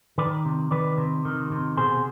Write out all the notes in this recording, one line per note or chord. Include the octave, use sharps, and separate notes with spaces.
D#3 B4 D5
C3
D#3 B4 D5
C3
D#3
C3
B2 G#4 C5